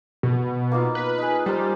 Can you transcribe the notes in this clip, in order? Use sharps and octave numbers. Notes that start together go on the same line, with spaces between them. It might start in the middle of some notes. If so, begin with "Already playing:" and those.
B2
A#3 D#4 F4
B4
D#4 G#4
G3 A#4 C5